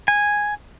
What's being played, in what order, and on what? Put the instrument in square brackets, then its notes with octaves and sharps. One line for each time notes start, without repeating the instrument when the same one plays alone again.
[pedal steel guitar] G#5